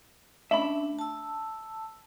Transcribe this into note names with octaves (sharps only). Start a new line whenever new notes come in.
A3 C#4 D4 E5 B5
A5 E6